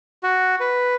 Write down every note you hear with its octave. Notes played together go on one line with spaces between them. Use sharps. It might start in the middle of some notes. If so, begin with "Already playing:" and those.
F#4
B4